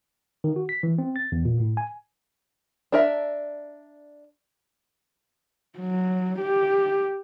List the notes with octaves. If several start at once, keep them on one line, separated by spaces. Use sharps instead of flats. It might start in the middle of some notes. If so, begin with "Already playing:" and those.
D#3
F#4
B6
E3
C4
A6
E2
A#2
A2
G#5
D4 A#4 E5
F#3
G4